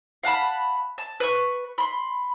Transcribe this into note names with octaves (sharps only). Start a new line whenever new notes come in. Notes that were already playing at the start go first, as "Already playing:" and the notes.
F5 F#5 A5 B5
A5
B4 C#6
B5 C6